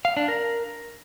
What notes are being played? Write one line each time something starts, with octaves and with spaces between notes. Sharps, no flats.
F5
D4
A#4